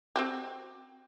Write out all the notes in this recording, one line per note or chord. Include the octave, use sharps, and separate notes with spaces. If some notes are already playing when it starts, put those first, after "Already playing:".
C4 F#4 G4